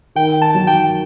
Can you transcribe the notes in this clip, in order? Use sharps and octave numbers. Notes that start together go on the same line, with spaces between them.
D#3 G5
A5
F#3
G5